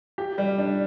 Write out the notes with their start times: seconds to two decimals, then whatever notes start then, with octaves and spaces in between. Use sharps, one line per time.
0.18 G4
0.38 G3
0.58 D4